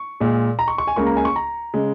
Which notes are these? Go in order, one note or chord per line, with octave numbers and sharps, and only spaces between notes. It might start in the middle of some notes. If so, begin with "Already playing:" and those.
Already playing: C#6
A#2 G#3
A#5
C#6
C#6
G#5
C#2 C#3 A#3 C#6
A#5
G#5
C#6
A#5
C#3 G#3